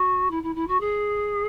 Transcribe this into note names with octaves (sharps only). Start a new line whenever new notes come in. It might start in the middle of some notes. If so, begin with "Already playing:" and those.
Already playing: F#4
E4
E4
E4
F#4
G#4